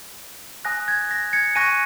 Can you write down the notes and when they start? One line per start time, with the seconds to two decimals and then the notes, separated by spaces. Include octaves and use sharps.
0.65 G#5 D#6 F#6 A#6
0.88 G#6
1.11 A#6
1.33 G#6 C#7
1.56 G#5 C#6 F#6 A#6 D#7